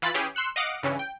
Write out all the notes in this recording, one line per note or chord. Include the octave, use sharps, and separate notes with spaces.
E3 F4 B5 A6
E3 C#4 G4 G#4
C6 E6 F#6 C#7
D#5 F5 F#5 D6
G2 C#3 E3 C#4
G5